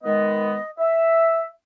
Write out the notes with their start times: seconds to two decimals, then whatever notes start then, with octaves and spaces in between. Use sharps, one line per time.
0.03 D#3 G#3 B3 D#5
0.78 E5